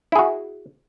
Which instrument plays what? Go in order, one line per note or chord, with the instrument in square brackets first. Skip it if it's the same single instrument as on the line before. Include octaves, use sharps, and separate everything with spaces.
[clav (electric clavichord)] E4
G#4
F#4